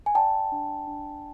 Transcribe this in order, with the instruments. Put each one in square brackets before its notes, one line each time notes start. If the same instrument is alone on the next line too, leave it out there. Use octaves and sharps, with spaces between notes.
[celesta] G#5
D5 G5 A5
D4
D4